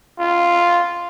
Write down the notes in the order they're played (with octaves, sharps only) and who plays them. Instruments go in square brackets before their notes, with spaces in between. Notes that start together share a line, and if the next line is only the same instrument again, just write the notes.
[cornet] F4